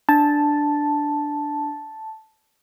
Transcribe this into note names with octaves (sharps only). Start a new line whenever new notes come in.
D4 A5